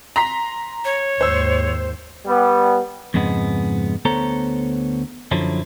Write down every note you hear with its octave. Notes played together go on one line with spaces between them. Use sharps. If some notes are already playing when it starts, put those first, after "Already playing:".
A#5 C6 B6
C#5
D#2 G#2 C5 E6
G3 B3
F2 G#2 C#3 G#3 B3
D2 B3 A4 C5 C#5 A#5
F#2 D3 F3 F#3 E4